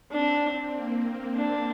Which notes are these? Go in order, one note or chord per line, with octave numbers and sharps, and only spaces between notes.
C4 D4
A#3
D4